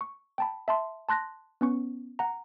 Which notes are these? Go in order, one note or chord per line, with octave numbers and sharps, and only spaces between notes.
C#6
G5 A5 B5
E5 A5 C6
A5 C6 F#6 A#6
B3 C#4 C#6
F#5 A#5